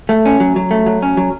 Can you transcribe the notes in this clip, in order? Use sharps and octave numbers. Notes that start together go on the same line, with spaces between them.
A3
C#4
F#3
F#3
A3
F#3
C#4
F#3